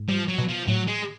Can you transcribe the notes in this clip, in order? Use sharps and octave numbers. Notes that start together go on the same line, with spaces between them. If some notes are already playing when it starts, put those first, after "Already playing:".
Already playing: G#2
F3 G3
F#3
B2
F3
A2 F#3
G#3